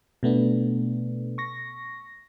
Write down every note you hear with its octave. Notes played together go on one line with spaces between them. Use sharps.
B2 A3 B3 D4
C#6 A#6